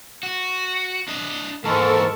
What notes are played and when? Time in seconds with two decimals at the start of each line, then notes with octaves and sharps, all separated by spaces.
0.23 F#4
1.08 D4 D#5
1.64 D#2 G#2 E3 G#3 A4 A#4 A5 C#6